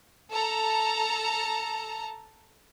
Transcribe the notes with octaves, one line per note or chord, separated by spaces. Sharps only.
A4 A5 A#5